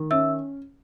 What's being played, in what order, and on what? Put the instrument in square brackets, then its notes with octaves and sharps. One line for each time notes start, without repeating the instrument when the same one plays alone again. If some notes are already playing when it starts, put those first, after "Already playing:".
Already playing: [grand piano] D#3
[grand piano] C#4 [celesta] E5 E6